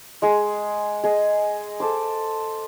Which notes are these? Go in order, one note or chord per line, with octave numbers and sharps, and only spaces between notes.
G#3 G#4
G#4 D#5
A4 C5 D6